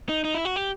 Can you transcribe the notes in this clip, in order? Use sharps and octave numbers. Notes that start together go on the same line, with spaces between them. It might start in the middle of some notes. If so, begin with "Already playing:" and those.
D#4
D#4
E4
F#4
G4